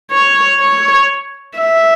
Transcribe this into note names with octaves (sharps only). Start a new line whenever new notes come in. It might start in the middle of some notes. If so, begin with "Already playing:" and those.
C#5
C#5
E5